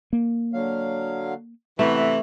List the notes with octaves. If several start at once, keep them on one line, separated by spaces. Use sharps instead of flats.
A#3
D3 F#3 F5
A2 C3 E3 A3 B3